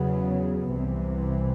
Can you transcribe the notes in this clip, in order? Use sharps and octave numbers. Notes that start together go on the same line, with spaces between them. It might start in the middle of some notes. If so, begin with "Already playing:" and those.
Already playing: E2 C#3 F#3 B3
C2 C3 E3